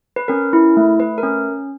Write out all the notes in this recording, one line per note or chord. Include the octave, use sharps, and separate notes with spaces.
B4
C#4 A#4
E4
A3
A3 B4
A#4
C#4